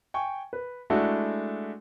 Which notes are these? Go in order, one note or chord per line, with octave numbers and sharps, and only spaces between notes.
G5 G#5 C#6
B4
G#3 A3 D4 E4 F#4